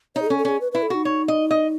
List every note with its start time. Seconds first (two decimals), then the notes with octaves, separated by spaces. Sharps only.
0.16 D#4 C#5
0.22 G#4
0.27 A4
0.30 C#4
0.38 A4
0.45 C#4 G#4
0.61 B4
0.72 E4 B4
0.83 A4
0.90 D#4 F#4
1.05 C#5
1.28 D#5
1.51 D#5